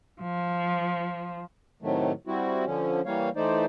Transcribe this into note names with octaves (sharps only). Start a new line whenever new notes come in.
F3
A2 C3 D#3 F#3 A3
G3 C4 E4 F#4
D3 F3 C#4
E3 G3 A#3 C#5 F5
E3 A3 D#4 C5 D5